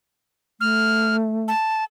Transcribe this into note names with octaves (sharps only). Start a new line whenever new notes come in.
A3 F6
A5